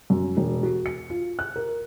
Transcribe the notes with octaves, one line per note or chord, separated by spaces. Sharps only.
F#2
E1
F#4
C#7
F4
F#6
A#4